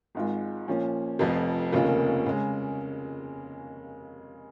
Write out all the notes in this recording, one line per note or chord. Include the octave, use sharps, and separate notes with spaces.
G#1 G#2 G#3 F4
A#2 F3 C#4
F1 F2 F3
F1 D#2 C#3 A#3 F4
C#3 G#3